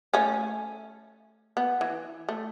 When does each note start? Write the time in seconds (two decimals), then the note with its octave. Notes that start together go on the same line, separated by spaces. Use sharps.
0.14 A3 C#4
1.57 B3
1.81 E3
2.29 A3